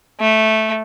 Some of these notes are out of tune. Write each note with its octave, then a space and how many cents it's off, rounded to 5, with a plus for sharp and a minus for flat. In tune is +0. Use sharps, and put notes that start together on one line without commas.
A3 -5